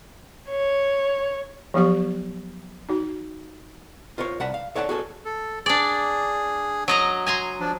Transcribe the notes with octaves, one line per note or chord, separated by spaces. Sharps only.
C#5
F3 F#3 B3 G4 C#6
D#4 F#4
F4 A#4 C5 C#5
C2 F#5 A5 B5
F5
A4 C#5 D5 F#5 G#5 A5
F#4 G#4 A4 C#5
A4
D4 G#4 D5
F#3 D#5 A#5
G#5 A#5 C6
F3 D4